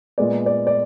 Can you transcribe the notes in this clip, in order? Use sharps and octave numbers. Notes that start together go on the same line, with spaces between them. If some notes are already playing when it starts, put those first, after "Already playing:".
A#2 G#3 B3 D5
D5
D5